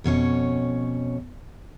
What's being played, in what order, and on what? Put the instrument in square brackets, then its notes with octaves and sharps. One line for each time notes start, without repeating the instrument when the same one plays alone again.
[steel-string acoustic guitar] F2 B2 C#4 C#5